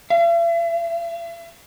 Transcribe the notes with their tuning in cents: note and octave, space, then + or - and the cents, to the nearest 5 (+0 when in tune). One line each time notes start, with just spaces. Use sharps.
E5 +45